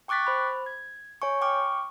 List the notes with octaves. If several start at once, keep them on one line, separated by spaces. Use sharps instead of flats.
G5 C#6 D6 F#6 A6 B6
C5 B5
G#6
C#5 G#5 C#6
G5 C#6 D6 F6